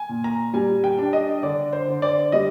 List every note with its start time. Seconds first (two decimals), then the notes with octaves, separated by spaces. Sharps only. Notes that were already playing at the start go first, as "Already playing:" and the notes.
Already playing: G#5
0.09 A#2
0.24 A#5
0.53 G3 G#5
0.84 G5
0.98 D4
1.13 D#5
1.43 D3 D5
1.73 C5
1.88 D3
2.02 D5
2.32 G3 D#5